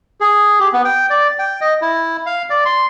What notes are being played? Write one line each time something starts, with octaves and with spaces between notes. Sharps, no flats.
G#4
G4
B3
G5
D5
G5
D#5
E4
F5
D5
C6